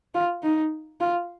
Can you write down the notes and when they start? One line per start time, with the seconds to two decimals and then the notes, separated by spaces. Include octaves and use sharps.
0.14 F4
0.43 D#4
1.00 F4